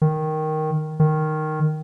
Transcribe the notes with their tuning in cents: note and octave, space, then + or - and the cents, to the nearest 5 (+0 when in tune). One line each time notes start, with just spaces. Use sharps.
D#3 +0
D#3 -5